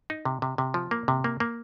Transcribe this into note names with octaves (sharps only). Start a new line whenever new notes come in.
D#4
C3
C3
C3
F3
A#3
C3
A#3
A#3